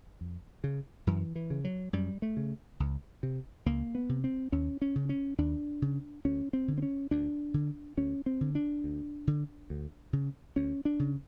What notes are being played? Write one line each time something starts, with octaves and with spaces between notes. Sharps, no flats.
F2
C#3
F#2 E3
E3
C#3
F#3
F#2 G3
A3
C#3
C#2
C3
C#2 A#3
B3
C3
C4
D#2 C#4
C#4
C#3
C#4
D#2 D4
C#3
D2 C#4
C4
D3
C4
C#4
D2 D4
D3
D2 C#4
C4
D3
D4
D2
D3
D2
C#3
D2 C#4
D4
C#3